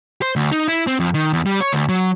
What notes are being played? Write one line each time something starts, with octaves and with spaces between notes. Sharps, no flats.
C5
D2
D#4
E4
C4
F2
D#3
E2
G3
C#5
D2
F#3